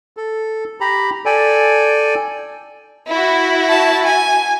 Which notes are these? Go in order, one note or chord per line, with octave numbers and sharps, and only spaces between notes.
A4
G4 A#5 B5
A4 D5 G5 G#5
E4 F#4
A5
G#5